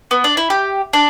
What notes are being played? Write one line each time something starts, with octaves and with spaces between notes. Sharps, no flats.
B3
D4
E4
G4
D4